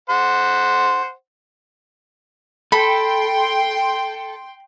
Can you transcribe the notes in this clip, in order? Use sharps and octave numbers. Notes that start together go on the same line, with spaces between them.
C5 F#5
A4 G5 B5 C6